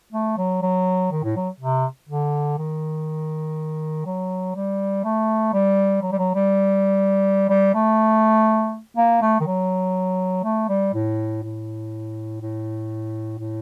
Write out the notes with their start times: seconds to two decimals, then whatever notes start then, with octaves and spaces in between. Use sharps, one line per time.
0.12 A3
0.37 F#3
0.62 F#3
1.11 D#3
1.23 A2
1.36 F#3
1.60 C3
2.09 D3
2.58 D#3
4.05 F#3
4.55 G3
5.04 A3
5.53 G3
6.02 F#3
6.12 G3
6.18 F#3
6.35 G3
7.49 G3
7.74 A3
8.97 A#3
9.21 A3
9.40 D#3
9.46 F#3
10.44 A3
10.69 G3
10.94 A2
11.43 A2
12.41 A2
13.39 A2